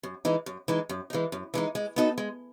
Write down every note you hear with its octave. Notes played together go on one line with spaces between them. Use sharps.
F#2
E3 G#3 D#4
F#2
E3 G#3 D#4
F#2
E3 G#3 D#4
F#2
E3 G#3 D#4
G#3
B3 D#4 F#4 A4
G#3